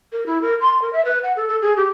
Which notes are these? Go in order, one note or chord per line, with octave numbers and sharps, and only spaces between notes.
A#4
E4
A#4
C6
A#4
E5
B4
F#5
A4
A4
G#4
G4